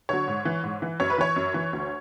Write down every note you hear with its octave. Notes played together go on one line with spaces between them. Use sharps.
D3 F#3 C#5
G#2
E3
G#2
E3
F#2 C#5
B4
E3 C#5
F#2
E3
D2